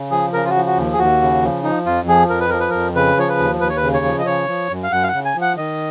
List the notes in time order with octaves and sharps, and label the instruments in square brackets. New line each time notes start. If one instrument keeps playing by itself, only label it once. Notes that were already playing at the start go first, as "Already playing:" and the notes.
Already playing: [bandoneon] C#3
F3 G#4
C#3 A#4
F4
F#4
F3
F#4
D#2
G#4
D#2 F#4
C#3
F3
F3 D#4
F2 F4
F3 G#4
F2 A#4
B4
F3 A#4
B4
F2 A#4
C#3 B4
F3 C#5
B4
D#2
D#2 B4
C#5
B4
C#3
C#5
F3
D#5
C#3 C#5
F3
F#2
F5
F#2 F#5
F5
F#5
C#3
G#5
F3
F#5
D#3 D#5